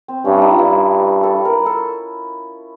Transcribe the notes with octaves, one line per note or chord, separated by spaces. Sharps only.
C4
G2 C#4
E4
D#4
F4
G2 E4
A4
A#4
A4